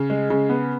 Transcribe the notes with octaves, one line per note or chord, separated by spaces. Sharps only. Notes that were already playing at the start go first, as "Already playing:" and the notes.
Already playing: C#3
G#3
C#3
B3